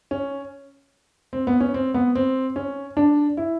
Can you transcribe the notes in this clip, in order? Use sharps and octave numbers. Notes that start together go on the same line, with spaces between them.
C#4
C4
B3
C#4
C4
B3
C4
C#4
D4
E4